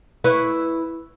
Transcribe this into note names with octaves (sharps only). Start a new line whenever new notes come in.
E4 B4 C#5